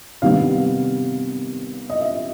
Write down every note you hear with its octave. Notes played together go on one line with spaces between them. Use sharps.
C3 D#3 G3 B3 D4 F5
D#5
E5